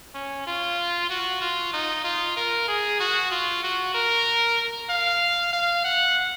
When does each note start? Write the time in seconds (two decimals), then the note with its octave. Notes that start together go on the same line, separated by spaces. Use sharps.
0.14 C#4
0.47 F4
1.10 F#4
1.41 F4
1.73 D#4
2.04 F4
2.37 A#4
2.68 G#4
3.00 F#4
3.31 F4
3.63 F#4
3.94 A#4
4.90 F5
5.53 F5
5.84 F#5